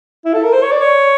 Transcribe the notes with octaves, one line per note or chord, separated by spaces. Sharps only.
E4
A4
A#4
C5
C#5
D5
C#5